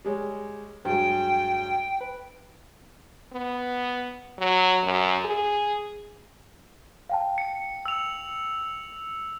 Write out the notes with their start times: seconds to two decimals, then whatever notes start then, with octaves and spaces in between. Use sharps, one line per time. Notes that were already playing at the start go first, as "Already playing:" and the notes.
0.05 G3 G#3 C#5
0.85 G2 F#3 G#3 G5
2.01 B4
3.33 B3
4.38 F#3
4.83 F#2
5.25 G#4
7.10 F5 G5 A5
7.38 C#7
7.86 E6 F7